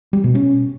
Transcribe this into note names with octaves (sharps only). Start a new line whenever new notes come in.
G3
B2
C#4